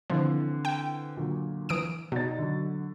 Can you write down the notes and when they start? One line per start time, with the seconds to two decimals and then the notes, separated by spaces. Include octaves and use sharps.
0.10 D3 E3 F3 C4
0.65 G5
1.17 A#2 D3 F#3
1.69 E3 D#6 D7
2.12 B2 D#4 D5 A6
2.38 D3 F#3